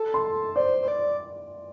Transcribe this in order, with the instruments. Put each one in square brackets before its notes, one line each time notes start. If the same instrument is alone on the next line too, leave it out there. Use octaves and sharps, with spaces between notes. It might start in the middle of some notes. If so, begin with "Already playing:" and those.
Already playing: [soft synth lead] A4
[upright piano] C6
[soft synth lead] C5 [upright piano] D5
[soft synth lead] C5
D5